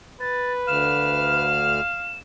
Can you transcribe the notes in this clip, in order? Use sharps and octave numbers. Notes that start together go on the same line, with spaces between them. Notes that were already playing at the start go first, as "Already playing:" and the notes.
B4 A6
D2 F5 F6 E7